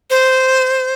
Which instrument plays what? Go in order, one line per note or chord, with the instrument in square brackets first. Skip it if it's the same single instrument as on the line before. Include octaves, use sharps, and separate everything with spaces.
[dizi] C5